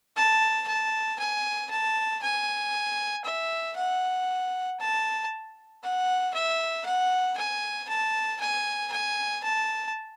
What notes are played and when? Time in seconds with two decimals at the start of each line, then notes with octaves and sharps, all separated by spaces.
0.16 A5
0.68 A5
1.19 G#5
1.71 A5
2.23 G#5
3.25 E5
3.77 F#5
4.79 A5
5.83 F#5
6.34 E5
6.86 F#5
7.37 G#5
7.89 A5
8.40 G#5
8.92 G#5
9.43 A5